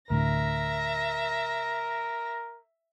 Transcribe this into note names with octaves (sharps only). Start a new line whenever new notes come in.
D2 A2 D3 A#4 E5 A#6